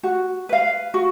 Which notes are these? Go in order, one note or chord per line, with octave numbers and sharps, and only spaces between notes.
F#4
B4 F5
F#4